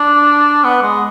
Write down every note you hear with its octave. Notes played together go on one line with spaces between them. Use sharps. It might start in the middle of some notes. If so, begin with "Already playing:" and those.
Already playing: D4
B3
G#3